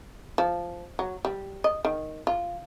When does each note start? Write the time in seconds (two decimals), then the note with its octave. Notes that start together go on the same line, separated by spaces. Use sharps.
0.38 F3
0.99 F#3
1.25 G3
1.64 D#5
1.85 D#3
2.27 F4